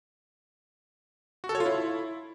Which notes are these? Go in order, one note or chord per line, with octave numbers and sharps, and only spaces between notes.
F#4
A4
C#5
F4
E4